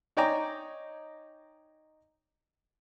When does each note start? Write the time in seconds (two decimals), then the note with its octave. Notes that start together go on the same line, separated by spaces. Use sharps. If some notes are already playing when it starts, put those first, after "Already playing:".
0.17 D#4 C#5 D5 G5 G#5 A#5